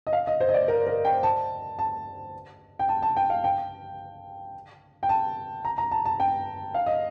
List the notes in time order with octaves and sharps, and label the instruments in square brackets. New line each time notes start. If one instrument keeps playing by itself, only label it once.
[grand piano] D#5
F5
D#5
C5
D#5
D5
A#4
A#4
G5
A5
A5
G5
A5
A5
G5
F5
G5
G5
A5
A#5
A#5
A5
A5
G5
F5
D#5